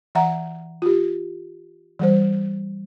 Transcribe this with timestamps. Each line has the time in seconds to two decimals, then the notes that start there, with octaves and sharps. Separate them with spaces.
0.15 E3 E5 F#5 A#5
0.82 F4 G4
1.99 E3 G3 C5